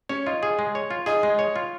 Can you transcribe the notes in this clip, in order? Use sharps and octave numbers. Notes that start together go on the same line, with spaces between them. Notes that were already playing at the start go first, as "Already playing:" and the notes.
C#4 C#5
D#4 F4
G#4
G#3
C#5
F4
D#4 G#4
G#3
C#5
F4